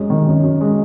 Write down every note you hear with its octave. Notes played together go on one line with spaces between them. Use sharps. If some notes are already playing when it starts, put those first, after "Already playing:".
Already playing: F#2 G#3
D#3
F#2
F#2
G#3